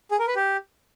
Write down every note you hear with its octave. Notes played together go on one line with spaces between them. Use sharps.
G#4
A#4
B4
G4